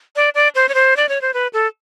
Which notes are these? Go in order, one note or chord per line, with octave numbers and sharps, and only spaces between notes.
D5
D5
C5
C#5
C5
D5
C#5
C5
B4
A4